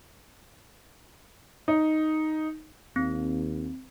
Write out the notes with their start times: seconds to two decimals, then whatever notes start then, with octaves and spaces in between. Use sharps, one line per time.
1.68 D#4
2.96 D#2 C4